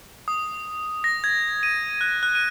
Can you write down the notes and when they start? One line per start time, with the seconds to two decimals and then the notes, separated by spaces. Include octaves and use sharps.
0.28 D#6
1.04 A#6
1.24 G#6
1.63 D#7
2.01 F#6
2.23 F#6
2.35 D#7